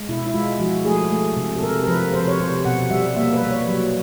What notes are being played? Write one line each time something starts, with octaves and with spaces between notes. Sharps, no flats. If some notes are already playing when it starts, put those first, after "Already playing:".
Already playing: G#3
B2 E4
E4
G#3 F4
F3 F#4
A3 G#4
A3
C3
A4
C3 A#4
A#4
F3 B4
C3 C5
C#5
C3 C5
B2 F#5
G3 E5
A#3 E5
B4
G3
C#5
F#3